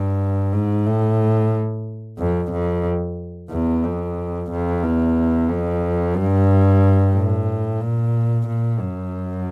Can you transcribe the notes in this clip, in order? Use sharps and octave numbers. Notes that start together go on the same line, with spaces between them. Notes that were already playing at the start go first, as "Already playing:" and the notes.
Already playing: G2
G#2
A2
F2
F2
E2
F2
F2
E2
F2
G2
A2
A#2
A#2
F#2